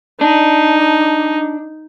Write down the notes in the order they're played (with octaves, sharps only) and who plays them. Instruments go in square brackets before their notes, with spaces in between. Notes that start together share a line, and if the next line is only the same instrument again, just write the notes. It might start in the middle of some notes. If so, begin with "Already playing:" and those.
[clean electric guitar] D4 [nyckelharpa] D#4